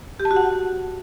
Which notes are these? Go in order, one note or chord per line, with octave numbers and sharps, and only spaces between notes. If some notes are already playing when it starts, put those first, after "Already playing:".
G4
A5
F#4
F#5